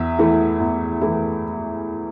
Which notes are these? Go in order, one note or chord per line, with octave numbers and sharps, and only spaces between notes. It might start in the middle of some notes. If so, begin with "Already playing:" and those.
Already playing: E2 E5
E3 A3 E4
E2
E3 A3 E4